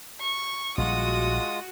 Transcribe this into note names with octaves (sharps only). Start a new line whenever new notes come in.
C#6
A#1 G3 G#3 F4 F#4 D#6